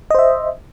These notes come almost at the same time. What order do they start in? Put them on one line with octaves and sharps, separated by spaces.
D#5 C5 E5